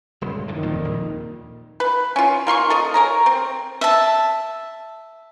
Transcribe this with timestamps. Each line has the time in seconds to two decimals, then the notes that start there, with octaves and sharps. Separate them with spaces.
0.21 D#1 C#2 G2
0.48 F#2 A2 D3 D#3
0.63 D#1 F2 A#2
0.85 A#1
1.80 B4
2.16 C#4 F4
2.47 A#3 F4 C6 C#6
2.70 A4 D#5
2.94 G#4 A#4 C#5 A#5
3.26 C4
3.81 E5 A5